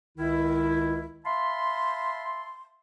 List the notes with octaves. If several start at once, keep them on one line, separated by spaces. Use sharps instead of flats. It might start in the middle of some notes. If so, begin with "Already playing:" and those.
C#2 D#3 E4
E5 F5 A5 B5 C6